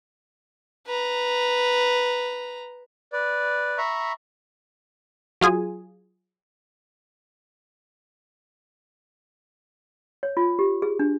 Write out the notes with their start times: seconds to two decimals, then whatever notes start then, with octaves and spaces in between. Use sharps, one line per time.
0.87 B4 A#5
3.13 B4 D5
3.78 E5 A#5 B5 C#6
5.41 F#3 F4 G#4 G#5
10.23 C#5
10.37 F4
10.59 G4
10.82 G#4
10.99 D4